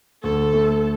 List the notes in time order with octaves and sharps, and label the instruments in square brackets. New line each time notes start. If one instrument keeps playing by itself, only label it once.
[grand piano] D2 [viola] A4
[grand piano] A3